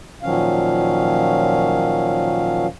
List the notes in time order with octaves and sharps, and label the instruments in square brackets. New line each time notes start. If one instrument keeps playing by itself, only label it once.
[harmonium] A#2 D#3 F3 F#3 C#4 F5